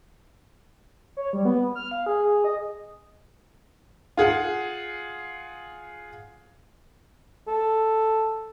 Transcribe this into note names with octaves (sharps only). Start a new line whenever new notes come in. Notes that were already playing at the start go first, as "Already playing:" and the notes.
C#5
G3
B3
F6
F5
G#4
G#4
D#5
F4 G#4 F#5
A4